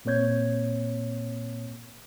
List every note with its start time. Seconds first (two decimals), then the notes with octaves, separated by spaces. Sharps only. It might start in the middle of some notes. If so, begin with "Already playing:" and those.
0.05 A#2 A#3 C4 C#5 G6 G#6